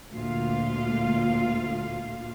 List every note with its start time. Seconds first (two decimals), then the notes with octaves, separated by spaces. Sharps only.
0.12 D2 A#2 F4 F5